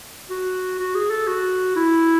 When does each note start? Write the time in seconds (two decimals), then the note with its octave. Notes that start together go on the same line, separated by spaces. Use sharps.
0.30 F#4
0.79 F#4
0.95 G#4
1.11 A4
1.27 F#4
1.76 E4